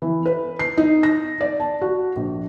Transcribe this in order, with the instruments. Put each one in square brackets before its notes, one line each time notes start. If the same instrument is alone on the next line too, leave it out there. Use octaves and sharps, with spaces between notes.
[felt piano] E3
B4
C7
D#4
A#6
D5
A5
F#4
A#1